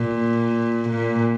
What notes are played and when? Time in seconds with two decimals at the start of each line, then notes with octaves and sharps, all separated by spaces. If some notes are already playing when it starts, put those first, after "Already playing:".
Already playing: A#2
0.89 A#2